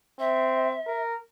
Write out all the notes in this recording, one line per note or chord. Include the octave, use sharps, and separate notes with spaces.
C4 E5
A#4